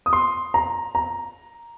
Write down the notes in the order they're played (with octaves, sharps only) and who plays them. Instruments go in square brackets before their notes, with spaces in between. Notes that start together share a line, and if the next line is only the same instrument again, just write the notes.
[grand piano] D#6
C6
A#5
A#5